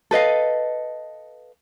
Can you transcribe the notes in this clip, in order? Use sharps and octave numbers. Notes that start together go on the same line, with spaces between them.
A4 B4 D#5 F5